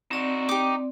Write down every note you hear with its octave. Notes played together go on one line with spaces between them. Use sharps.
C4 D#4 F#4 D5
D#4 G4 D6